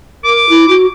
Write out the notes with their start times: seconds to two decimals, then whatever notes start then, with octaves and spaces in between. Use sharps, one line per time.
0.24 A#4 D6
0.49 E4
0.69 F#4